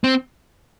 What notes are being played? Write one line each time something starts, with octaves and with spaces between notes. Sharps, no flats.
C4